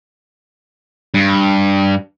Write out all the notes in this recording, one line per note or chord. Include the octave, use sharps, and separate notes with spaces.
G2